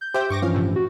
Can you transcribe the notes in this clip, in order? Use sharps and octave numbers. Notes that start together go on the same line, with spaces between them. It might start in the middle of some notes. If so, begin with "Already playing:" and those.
G6
G4 C5 E5 G5
G2 C#6 D6 A#6
E3 F3 C#4 F5
A2 C3
F#4